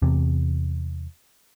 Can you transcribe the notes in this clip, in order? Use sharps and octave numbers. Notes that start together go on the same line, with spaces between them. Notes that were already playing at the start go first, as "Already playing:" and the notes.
E2 C3